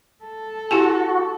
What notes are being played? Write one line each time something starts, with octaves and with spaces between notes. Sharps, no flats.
A4
E4 F#4 G4 G#5